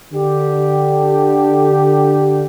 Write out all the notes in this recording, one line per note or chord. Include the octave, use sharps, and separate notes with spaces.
D3 G4